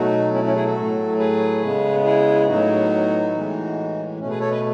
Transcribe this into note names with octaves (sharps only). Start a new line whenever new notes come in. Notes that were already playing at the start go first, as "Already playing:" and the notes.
Already playing: B2 F#3 A3 D#4 F#4
C#4 E4
C#4 E4
E4 G#4
F#4 A4
A2 F#3 A3
G#4 B4
C#3 G#3 B3
E4 G#4
A2 F#3 B3 D#4 F#4
A2 E3 G#3
B2 A3 C#4
G#4 B4
A4 C#5
B4 D#5